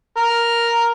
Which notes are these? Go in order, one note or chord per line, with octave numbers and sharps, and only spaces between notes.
A#4